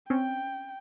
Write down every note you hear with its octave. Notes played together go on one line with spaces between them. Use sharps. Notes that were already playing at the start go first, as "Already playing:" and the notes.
C4 C#4 G5